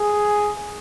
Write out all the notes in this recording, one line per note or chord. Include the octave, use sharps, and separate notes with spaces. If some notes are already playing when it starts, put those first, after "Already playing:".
Already playing: G#4